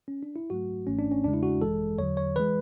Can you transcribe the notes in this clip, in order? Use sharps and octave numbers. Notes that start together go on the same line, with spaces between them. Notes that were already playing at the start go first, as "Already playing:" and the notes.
C#4
D4
E4
G#2 F#3 A3 F#4
G#1 G#2 E3 A3 C#4
D4
C#4
E2 C#3 G#3 D4
E4
F#4
G#1 F#2 E3 G#3 A4
E2 D3 F#3 C#5
C#5
E3 G#3 B4